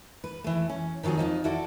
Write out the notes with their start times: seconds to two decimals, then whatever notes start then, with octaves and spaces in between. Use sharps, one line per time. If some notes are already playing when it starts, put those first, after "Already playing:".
0.24 B4
0.44 E3 A3
0.69 C#4
1.03 D#3 F3 F#3 C4 G#4
1.17 F2 G#2 F3 D#4
1.44 E4 F#4 A4 D5